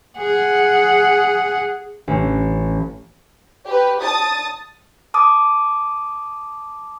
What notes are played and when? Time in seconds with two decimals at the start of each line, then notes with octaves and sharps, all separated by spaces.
0.18 G#4 F#5
2.08 A1
3.65 G4 B4
4.00 A5 D#6 A6
5.14 A5 D6 D#6